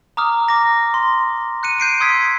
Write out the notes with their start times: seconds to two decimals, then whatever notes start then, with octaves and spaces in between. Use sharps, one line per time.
0.17 A#5 D6 D#6 F6
0.48 D6 A#6
0.94 C6
1.63 F#6 C#7 D#7
1.79 G6 C7 D7 D#7
2.00 C6 D#6 E6 G#6 B6